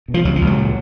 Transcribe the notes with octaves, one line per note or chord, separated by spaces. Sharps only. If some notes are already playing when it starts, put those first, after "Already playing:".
B2
F3
C#2 F#3
F3
C#2
F#3
A#2